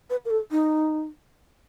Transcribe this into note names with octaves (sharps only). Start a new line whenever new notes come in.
B4
A#4
A4
D#4